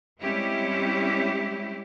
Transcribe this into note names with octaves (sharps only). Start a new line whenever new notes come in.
G3 G#3 C4 C#4 E4 G4